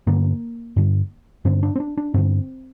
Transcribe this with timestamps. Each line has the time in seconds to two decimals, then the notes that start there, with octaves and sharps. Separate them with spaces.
0.07 G2 D3 A#3
0.76 G2 D3
1.45 G2 D3 C4
1.63 D4
1.76 C4
1.80 D4
1.97 D4
2.14 G2 D3 C4